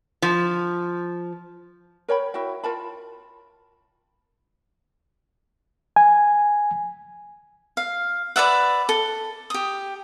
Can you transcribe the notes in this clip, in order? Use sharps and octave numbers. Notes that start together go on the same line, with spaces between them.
F3
A#4 C#5 G5 B5
E4 F#4 G5
F4 A#4 A5 B5
G#5
F5
B4 D5 E5 F#5
A4
G4 D#6